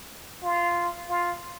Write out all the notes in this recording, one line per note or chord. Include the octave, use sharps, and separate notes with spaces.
F4
F4